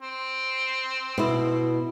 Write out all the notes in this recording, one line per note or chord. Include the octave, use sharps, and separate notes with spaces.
C4
B2 E4